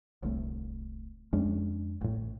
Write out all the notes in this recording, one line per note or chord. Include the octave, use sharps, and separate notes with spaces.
D1 C2 A3
F2 G#3 C#4 D4
A1 A2